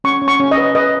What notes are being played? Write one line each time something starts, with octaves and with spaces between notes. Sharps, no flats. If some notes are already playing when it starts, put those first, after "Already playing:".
C#4 C#6
C#4
C#6
C#4
D#5
B4
B4 D#5